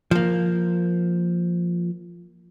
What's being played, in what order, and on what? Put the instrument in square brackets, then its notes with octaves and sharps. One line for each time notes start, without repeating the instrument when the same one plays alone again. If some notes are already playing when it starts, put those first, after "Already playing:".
[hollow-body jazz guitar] F3 A#3